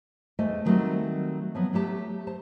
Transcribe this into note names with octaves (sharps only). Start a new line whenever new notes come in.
E2 A3 C5 D#5 G#5
D3 D#3 F#3 G3 A3 C4
F3 F#3 B3
F#3 A3 G4 A5
C5 A5